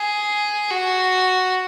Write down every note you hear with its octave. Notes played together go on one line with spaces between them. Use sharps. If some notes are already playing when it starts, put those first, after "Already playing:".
Already playing: G#4
F#4